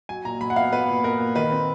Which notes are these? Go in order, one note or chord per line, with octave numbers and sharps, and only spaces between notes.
F#3 G#5
A#2 A#5
F#3 B5
F#5
B3 F5
B3 B4
A#2
B3 A#4
A#2
D#3 B4
C4